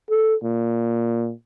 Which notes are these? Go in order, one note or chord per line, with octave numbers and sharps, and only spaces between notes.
A4
A#2